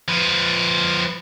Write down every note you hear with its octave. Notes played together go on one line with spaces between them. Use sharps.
F3 B4